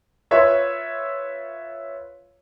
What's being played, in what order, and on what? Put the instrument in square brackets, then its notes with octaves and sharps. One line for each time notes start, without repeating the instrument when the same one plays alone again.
[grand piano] F4 B4 C#5 E5